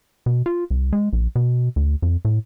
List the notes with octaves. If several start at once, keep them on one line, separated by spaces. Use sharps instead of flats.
B2
F4
C2
G#3
A#1
B2
D2
F2
A2